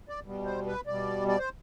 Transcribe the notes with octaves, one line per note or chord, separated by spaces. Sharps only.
D5
B2 G3
C5
B4
B2 G3 D5
D5
C5